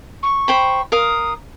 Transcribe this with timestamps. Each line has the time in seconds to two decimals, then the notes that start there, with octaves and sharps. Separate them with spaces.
0.23 C#6
0.48 C5 G5 B5
0.92 A#4 F5 D#6